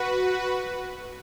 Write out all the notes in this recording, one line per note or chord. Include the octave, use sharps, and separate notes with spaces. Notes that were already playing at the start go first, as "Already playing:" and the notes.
Already playing: F#4 B4